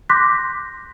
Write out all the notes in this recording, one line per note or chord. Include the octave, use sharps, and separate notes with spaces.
C6 D6 F#6 G6 A#6 B6